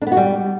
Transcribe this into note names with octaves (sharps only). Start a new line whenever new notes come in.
D4
B3
F#4
G3